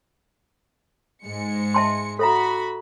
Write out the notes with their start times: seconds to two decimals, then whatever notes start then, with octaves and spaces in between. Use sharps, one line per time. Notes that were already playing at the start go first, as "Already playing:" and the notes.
1.26 G#2 G#3 C#7
1.74 E5 A5 C6
2.19 F#4 A4 E5 A#5 B5